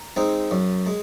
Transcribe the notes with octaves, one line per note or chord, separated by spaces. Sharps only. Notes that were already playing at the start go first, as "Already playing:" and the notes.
Already playing: A#5
G#3 C4 D#4
F#2
G#3